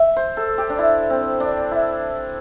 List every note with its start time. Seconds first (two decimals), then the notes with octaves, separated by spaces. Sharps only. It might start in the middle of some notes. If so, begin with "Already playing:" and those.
Already playing: E5
0.17 C5
0.37 A4
0.58 G4
0.70 D4
0.78 E4
1.10 C4
1.40 D4
1.71 E4